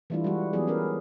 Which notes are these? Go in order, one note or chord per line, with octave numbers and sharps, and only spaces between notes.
E3 G3 A3 D4 E4 F4
G3 G#3 F#4
E3 F#3 B3 G4 G#4 D5
C#4 E4 A#4 B4